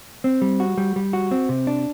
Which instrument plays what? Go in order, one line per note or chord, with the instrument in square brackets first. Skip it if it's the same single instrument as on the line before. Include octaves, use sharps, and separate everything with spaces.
[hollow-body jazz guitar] C4
G3
F#4
G3
G3
F#4
C4
C3
D4